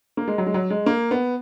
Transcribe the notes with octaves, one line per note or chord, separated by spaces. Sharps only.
A#3
G#3
F#3
G#3
F#3
G#3
A#3
B3